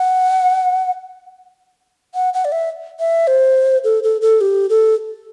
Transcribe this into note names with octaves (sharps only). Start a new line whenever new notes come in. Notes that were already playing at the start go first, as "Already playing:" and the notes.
Already playing: F#5
F#5
F#5
D5
E5
E5
C5
A4
A4
A4
G4
A4